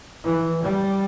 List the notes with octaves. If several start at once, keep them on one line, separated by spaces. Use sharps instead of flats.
E3
G3